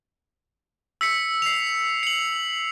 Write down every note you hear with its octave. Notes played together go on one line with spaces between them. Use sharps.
E6 B6 C#7
C7 F7
C#7 F#7